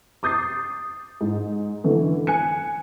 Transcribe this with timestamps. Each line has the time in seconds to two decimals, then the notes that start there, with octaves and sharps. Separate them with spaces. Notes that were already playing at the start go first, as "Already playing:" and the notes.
0.23 D6 D#6 G6 A6 C7
1.21 G#2
1.84 D3 E3 A3
2.27 G#5 F#6 C#7